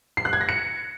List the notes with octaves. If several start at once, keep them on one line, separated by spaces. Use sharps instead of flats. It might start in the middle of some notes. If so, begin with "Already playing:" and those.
C7
F#6
G#6
A#6
C#7